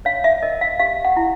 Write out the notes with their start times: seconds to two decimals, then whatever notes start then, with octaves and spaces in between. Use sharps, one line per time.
0.05 C#5 F5
0.24 E5
0.43 A#4 D#5
0.61 F5
0.79 G4 F5
1.05 F#5
1.17 E4